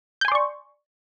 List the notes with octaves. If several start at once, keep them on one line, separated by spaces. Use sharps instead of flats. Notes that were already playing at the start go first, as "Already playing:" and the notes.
D5 G#5 C6 C#6 G6